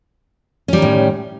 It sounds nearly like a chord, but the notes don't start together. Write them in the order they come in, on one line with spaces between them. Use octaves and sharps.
C#4 G3 D#3 A2